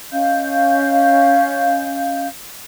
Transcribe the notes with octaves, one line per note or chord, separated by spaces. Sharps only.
C#4 D#5 F5 G6